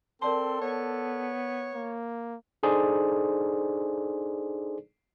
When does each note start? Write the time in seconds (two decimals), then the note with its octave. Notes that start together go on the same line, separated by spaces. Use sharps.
0.22 C4 A4 A#4 D5 A5 C6
0.61 B3 C#5
1.74 A#3
2.63 D4 D#4 G#4 A4 C5 D5